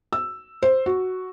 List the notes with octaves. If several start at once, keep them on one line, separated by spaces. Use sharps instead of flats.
E6
C5
F#4